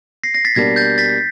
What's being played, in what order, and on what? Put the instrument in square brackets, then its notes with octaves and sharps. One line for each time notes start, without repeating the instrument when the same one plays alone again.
[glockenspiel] A#6 C7
A#6 C7
A6 B6
[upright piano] B2 G3 A#3 D4 [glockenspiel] G#6 A#6
[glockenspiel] G6 A6
A6 B6